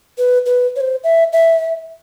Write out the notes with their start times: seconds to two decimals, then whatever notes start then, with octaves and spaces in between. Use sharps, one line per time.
0.18 B4
0.46 B4
0.76 C#5
0.81 C5
1.04 E5
1.33 E5